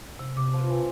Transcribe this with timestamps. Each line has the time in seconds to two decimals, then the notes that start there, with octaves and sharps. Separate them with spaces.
0.19 C3
0.37 C3 D6
0.53 F3 F4 B4
0.67 G2 E3 C4